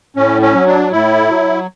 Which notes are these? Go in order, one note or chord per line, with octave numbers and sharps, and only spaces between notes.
A2 C#4
C#4
F#3
D4
A2 E4
F#3